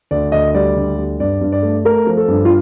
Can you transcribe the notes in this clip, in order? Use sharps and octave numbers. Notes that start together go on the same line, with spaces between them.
D2 D5
D2 D#5
G3 D5
D2
G3
G2 D5
G2
D5
A3
A3 A#4
F3
A4
G2
F4